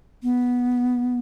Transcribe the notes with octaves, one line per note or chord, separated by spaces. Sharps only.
B3